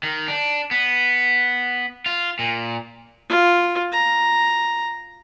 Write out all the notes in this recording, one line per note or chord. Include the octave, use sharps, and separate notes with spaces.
D#3
D4
B3
F4
A#2
F4
A#5